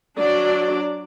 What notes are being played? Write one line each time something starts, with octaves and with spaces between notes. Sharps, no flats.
F#3 D4 D5